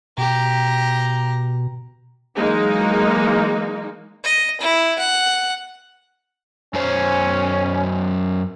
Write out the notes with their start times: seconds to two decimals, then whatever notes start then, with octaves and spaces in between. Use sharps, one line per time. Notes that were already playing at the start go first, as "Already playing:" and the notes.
0.18 B2 G4 A#5
2.36 E3 F#3 G#3 A#3 D#4
4.24 D#5
4.61 E4
4.98 F#5
6.74 F#2 F#3 C#4 C5